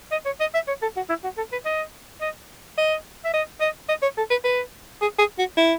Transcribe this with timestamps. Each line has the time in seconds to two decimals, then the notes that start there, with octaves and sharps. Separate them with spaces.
0.11 D#5
0.25 C#5
0.40 D#5
0.54 E5
0.68 C#5
0.82 A4
0.96 F#4
1.09 E4
1.24 F#4
1.37 A4
1.52 B4
1.65 D#5
2.21 D#5
2.78 D#5
3.25 E5
3.33 D#5
3.60 D#5
3.89 D#5
4.02 C#5
4.17 A4
4.30 B4
4.44 B4
5.01 G#4
5.18 G#4
5.38 F#4
5.57 E4